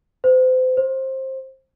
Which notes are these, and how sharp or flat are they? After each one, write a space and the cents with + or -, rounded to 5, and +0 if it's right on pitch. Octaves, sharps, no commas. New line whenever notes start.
C5 -35
C5 +20